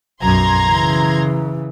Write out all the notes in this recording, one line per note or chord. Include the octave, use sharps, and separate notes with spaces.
B1 F#2 A#5 C6 G#6
C#3 E3